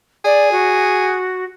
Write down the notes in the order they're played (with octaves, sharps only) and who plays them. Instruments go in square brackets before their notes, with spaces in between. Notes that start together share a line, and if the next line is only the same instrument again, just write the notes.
[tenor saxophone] G#4 [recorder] D5
[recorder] F#4